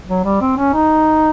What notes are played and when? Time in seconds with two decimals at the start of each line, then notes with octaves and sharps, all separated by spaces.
0.08 F#3
0.25 G3
0.41 C4
0.57 C#4
0.73 D#4